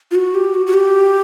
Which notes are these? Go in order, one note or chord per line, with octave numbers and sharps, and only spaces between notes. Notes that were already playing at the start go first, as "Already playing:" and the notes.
F4
F#4
G4
F#4
F#4
G4